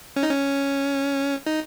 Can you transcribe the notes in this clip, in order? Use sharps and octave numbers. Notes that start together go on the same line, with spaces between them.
C#4
D#4
C#4
D#4